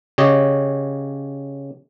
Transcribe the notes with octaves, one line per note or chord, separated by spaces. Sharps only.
C#3 G4 C#5 D#5